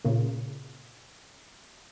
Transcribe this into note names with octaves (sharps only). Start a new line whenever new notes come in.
A#2 C#3 A#3